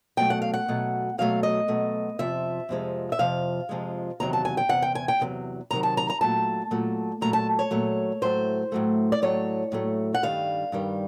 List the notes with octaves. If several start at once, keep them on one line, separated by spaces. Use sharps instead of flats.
B2 F#3 A3 G5
F#5
F5
F#5
B2 F#3 A3
B2 F#3 A3 F5
D#5
B2 F#3 A3
F2 C3 F3 E5
F2 C3 F3 G#3
E5
F2 C3 F3 F5
F2 C3 F3 G#3
E2 C3 D#3 F#3 A#5
A5
G#5
G5
E2 C3 F#5
G5
G#5
G5
E2 C3 D#3 F#3
E2 C3 D#3 F#3 A#5
A5
A#5
A#5
A#2 F#3 A3 A5
A#2 F#3 A3
A#2 F#3 A3 A#5
A5
C#5
A#2 F#3 A3
A2 F#3 A3 C5
A2 F#3 A3
D5
A2 F#3 A3 C#5
A2 F#3 A3
F#5
G2 D#3 G3 F5
G2 D#3 G3